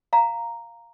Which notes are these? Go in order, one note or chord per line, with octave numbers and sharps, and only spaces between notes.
F5 A#5